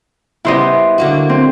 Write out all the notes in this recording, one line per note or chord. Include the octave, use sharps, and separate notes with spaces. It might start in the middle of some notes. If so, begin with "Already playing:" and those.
C#3 G3 B3 E4 C5 D#5
D3 A#3 F#4
C4